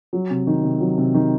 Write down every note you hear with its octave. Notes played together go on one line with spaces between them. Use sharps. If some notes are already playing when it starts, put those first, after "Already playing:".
F#3
C3
D#3
C3
F#3
C3
D#3